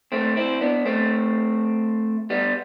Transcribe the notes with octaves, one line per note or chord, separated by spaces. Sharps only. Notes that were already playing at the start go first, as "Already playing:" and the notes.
A3 C4
C4 E4
B3 D4
A3 C4
G3 B3